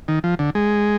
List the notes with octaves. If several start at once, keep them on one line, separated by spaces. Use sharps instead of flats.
D#3
F3
D3
G#3